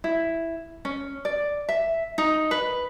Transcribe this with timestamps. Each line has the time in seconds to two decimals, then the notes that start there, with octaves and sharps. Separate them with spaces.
0.04 E4
0.85 C#4
1.25 D5
1.69 E5
2.18 D#4
2.51 B4